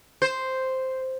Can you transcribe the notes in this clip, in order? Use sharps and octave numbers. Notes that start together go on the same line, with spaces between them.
C5